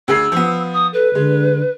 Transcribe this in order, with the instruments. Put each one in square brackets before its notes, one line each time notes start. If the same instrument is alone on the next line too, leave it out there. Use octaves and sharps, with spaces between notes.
[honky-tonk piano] D2 G#4 C7 [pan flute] E6
[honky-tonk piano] F3 B3
[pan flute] D#6
[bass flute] A4 [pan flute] B4
[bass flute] D3 [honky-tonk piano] G#3